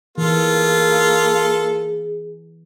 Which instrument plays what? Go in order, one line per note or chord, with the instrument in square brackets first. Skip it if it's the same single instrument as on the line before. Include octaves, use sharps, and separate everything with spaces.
[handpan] E3 [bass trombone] A#3 [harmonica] F4 A4 [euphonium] G#4